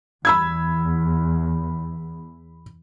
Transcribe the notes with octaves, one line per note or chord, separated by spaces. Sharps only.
E2 B5 E6 G#6